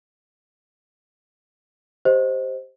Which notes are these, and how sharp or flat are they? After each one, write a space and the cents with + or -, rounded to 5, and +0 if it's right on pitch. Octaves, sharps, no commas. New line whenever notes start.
G4 +0 C5 +0 D#5 +20